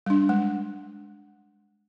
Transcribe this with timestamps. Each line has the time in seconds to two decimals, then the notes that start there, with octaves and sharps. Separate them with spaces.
0.06 G3 D4
0.29 G#3